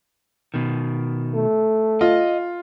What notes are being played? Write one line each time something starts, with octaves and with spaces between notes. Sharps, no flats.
B2 D#3
A3
F4 D#5